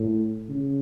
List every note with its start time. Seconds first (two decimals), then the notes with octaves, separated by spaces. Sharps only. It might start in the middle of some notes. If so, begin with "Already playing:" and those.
Already playing: A2
0.49 C#3